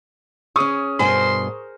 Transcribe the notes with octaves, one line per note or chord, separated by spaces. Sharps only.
C#4 G#4 C#6 D#6
G2 B2 A#4 C5 G#5 C6